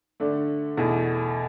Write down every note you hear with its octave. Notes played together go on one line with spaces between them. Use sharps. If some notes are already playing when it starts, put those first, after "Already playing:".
D3 A3 D4
E2 B2 A3